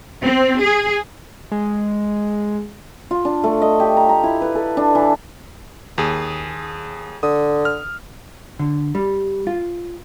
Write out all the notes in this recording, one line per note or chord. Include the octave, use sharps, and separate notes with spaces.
C4
G#4
G#3
F4
D4
A3
D#5
G4
A#5
A#5
E4
B4
A4
D4
E3
D#2 G#4
D3 D#6
F6
D3
G3
F4